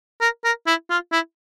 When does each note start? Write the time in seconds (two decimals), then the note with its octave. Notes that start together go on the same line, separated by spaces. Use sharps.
0.21 A#4
0.44 A#4
0.67 E4
0.90 F4
1.12 E4